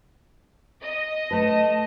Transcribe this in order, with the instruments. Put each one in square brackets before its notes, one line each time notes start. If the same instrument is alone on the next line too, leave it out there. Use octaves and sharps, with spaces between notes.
[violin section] D#5
[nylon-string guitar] A3 B4 [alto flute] A5